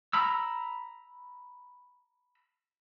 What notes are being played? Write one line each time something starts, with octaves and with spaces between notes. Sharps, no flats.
A#5 B5 E6